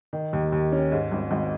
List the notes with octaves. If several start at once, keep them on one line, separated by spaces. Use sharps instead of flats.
D#3
D#2
D#2
C#4
G#2
G#1
G#1